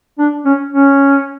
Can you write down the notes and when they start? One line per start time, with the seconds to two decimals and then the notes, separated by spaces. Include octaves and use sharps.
0.18 D4
0.45 C#4
0.73 C#4